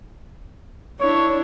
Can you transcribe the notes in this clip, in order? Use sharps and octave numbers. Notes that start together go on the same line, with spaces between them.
D4 E4 C#5